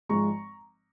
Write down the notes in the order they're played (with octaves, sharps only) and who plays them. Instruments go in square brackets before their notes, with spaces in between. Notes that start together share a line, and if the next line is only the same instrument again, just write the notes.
[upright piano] G#1 G#2 F3 G#3 A#5 C#6